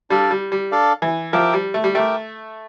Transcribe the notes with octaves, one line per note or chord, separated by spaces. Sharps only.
G3 D4 A4 D5 F5
G3
G3
D4 A4 D5 F5
E3
F3 G4 A#4 E5 G5
G3
A3
G3
A3 G4 A#4 E5 G5